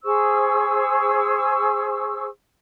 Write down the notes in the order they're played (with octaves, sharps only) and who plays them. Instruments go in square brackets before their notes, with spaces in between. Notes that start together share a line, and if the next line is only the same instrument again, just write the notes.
[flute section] G#4 C5 C#6 E6